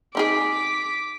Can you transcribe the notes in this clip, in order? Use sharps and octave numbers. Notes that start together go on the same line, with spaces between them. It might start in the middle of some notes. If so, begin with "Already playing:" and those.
C4 D#4 G#4 D6 B6